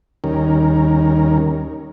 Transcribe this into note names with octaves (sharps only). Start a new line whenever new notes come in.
D#2 D#3 G3 C#4 A#4